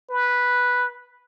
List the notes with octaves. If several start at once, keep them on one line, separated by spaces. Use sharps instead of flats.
B4